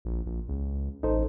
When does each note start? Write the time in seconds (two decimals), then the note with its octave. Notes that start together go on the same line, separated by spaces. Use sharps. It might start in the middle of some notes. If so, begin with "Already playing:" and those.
0.05 A#1
0.26 A#1
0.48 C#2
1.03 A1 D#4 A4 C5